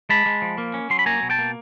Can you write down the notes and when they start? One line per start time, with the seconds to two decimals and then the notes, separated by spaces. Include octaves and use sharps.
0.09 G#3 A5 B5
0.26 G#3
0.42 F3
0.58 A#3
0.74 C#4
0.90 F#3 C6
0.99 B5
1.06 A#3 G#5 A#5
1.22 B2
1.30 G5 A5
1.39 A#3